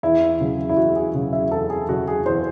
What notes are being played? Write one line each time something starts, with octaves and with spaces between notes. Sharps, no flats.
E2 E4
C#3 F#3
E4
E2 F#4
G#4
C#3 F#3
E5
E2 A4
G#4
C#3 F#3 F#4
G#4
E2 C5